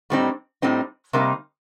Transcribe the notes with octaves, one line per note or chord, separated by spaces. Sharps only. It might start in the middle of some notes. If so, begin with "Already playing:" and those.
A2 G3 C4 D#4
A2 G3 C4 D#4
C3 G3 A#3 D#4